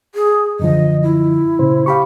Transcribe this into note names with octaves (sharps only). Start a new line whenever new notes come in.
G#4
F#2 D3 F3 D#5
E4
A#2 C#3 C5
G4 F5 B5 C#6